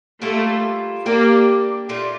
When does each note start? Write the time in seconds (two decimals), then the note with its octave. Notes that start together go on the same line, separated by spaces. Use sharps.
0.22 G3 A3 A#3 F4 A4
1.06 G3 A#3 D4 G4
1.89 A#2 A3 D4 F4